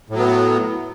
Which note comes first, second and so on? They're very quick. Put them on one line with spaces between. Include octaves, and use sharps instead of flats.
A2 F#3 B3